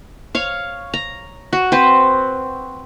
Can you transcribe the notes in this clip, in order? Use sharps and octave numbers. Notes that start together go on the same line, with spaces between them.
C#5 F5
A#5
F#4
C4 B4 C5